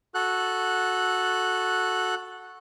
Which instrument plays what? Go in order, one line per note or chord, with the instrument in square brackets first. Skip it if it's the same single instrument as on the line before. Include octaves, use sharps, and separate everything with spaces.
[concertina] F#4 A4 F#6